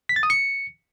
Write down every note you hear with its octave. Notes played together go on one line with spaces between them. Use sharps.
B6
A6
D#6
C#7